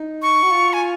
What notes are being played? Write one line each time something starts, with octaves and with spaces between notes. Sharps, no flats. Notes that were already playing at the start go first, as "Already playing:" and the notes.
Already playing: D#4
C#6
F#4
F4
G#5